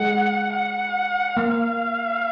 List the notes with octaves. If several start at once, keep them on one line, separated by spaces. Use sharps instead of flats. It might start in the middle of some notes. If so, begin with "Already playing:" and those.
Already playing: G#3 F#5
F#5
A#3 F5